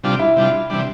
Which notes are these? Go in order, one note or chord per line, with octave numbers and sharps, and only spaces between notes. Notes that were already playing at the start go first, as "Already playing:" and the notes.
C3 G3 D4 F4
E4
C3 G3 D4 F4
C3 E3 G3 D4